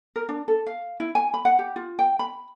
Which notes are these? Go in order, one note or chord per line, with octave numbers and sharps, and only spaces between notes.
A#4
D4
A4
F5
E4
G#5
B5
F#5
G4
F4
G5
B5